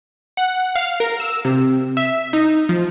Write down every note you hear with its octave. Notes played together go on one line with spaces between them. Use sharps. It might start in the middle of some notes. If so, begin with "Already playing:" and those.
F#5
F5
A#4
E6
C3
E5
D#4
F3